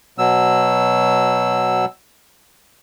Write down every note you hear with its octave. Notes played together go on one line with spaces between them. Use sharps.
B2 F#3 E6